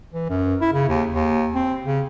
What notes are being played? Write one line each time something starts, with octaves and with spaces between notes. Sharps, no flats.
E3
F#2
E4
C#3
D#2
D#2
C4
C#3